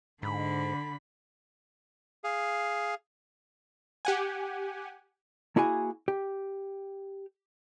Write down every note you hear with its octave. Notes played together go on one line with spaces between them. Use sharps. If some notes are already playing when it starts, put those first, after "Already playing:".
G#2 D3 B5
G#4 F5
G4 F#5 G#5
A#3 E4 F#4 G#4 G#5
G4